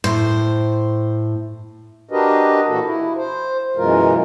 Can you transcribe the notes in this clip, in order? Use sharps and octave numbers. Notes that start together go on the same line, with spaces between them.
A2 C5
D4 F#4 G4 A#4 B4 D#5
A#2 E3 A#3 F#4 A4
E4
C5
F#2 B2 E3 G#3 F4 A#4